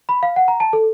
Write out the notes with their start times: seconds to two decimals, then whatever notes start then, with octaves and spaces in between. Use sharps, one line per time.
0.09 B5
0.23 F5
0.36 F#5
0.48 A#5
0.60 A5
0.73 A4